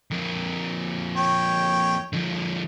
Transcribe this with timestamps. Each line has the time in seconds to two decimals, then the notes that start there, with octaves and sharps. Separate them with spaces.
0.11 F2 A#3
1.17 C#5 G5
2.13 D3 F3